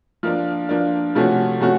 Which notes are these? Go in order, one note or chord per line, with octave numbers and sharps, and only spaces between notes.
F3 A#3 D4
F3 A#3 D4
C3 F3 A3 C#4 F#4
C3 F3 A3 C#4 F#4